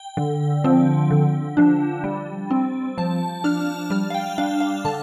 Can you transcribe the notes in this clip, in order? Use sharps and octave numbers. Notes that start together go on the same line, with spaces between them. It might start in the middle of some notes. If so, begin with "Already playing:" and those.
Already playing: G5
D3
F3 C4
D3
F3 D4
G3
C4
F3 A5
D4 F6
G3 F6
F5
G5
D4 F5
F5
D3 A5